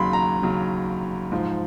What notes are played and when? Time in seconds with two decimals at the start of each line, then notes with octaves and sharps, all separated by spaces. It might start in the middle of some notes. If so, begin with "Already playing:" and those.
Already playing: D#2 C#3 F#3 B5 C6
0.13 A#5
0.43 D#2 C#3 F#3
1.32 G#2 F3